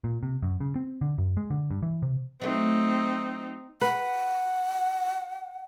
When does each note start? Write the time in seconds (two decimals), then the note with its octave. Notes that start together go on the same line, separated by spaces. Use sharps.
0.04 A#2
0.23 C3
0.43 F#2
0.60 C#3
0.76 C4
1.01 D3
1.18 F#2
1.37 G#3
1.50 D3
1.70 G2
1.82 E3
2.02 C3
2.42 F#3 A3 C4 D#4
3.81 B4 F#5